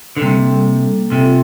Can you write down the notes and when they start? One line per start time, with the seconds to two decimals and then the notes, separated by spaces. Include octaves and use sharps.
0.17 D3
0.21 C3 G3 A#3 D4 A4
1.10 C3 C4 F4 A4